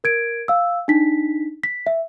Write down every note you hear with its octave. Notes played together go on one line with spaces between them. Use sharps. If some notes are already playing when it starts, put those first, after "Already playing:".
A#4 G#6 D7
F5 E6
D4 D#4 B6
B6
E5